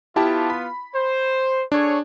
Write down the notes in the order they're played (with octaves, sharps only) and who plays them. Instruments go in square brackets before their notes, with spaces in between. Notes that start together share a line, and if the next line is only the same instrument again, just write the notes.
[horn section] B3 F4 [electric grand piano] E4 G4 A5
[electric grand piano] B5
[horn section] C5
[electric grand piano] D4 [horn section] G#4 A4 C#5